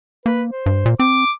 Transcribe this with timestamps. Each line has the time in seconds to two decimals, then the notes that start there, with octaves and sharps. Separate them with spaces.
0.26 A#3 B4
0.50 C5
0.66 G2
0.86 A#2
1.00 C4 D6